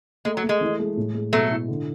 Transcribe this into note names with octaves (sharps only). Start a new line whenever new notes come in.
G#3 A3
F#3
A3
G#3
E3
G#3
A2
G#3
B2 F#3 A3
E4
D3